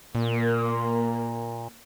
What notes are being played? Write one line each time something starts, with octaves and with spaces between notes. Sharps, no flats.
A#2 A#3